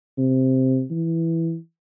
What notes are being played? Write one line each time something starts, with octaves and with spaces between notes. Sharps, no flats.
C3
E3